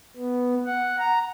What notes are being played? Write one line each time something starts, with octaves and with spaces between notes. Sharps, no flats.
B3
F#5
A#5